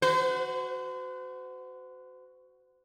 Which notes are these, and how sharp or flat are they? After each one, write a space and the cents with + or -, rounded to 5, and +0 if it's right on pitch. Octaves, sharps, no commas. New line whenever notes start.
F#4 +0 C5 -40